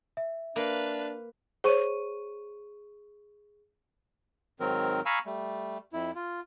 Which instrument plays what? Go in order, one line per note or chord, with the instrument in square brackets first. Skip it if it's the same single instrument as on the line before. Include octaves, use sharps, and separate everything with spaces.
[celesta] E5
[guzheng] A#3 [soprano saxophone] D4 [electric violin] B4 F5
[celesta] G#4 C#6 D#7 [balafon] C5 C#5
[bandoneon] G#2 D#3 F#3 C4 A#4
F5 G#5 A#5 B5 C#6 E6
G3 A3
F2 E4
F4